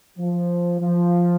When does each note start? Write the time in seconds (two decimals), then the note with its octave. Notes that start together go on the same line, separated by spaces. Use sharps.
0.18 F3
0.80 F3